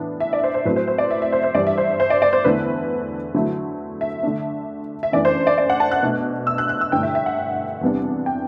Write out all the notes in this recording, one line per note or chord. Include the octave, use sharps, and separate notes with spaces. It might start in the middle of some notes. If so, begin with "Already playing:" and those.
Already playing: A2 E3 B3 D4
E5
D5
C5
C5
A2 F#3 A3 C4 B4
C5
C5
D5
E5
E5
C5
C5
G2 E3 G3 D5
E5
C5
C5
D5
D5
C5
E2 D3 A3 E4 B4
D3 F#3 A3 E4
E5
D3 A3 D4
E5
F#2 E3 A3 D4 D5
C5
D5
D5
F#5
A5
F#6
B2 A3 D4
E6
F#6
F#6
E6
G2 D3 A3 E4 G5
E5
E5
F#5
E2 C3 G3 B3 D4
G5